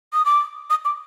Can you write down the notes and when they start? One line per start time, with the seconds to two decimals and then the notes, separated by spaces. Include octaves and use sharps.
0.13 D#6
0.25 D6
0.70 D#6
0.85 D6